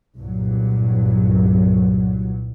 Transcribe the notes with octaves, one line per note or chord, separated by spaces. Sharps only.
C2 G2 A#2 F#3